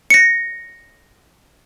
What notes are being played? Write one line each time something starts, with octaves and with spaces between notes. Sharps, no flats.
A#6 C#7